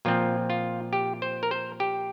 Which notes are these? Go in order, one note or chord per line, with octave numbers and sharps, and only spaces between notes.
A#2 F3 C4 F4
F4
G4
C5
A#4
C5
G4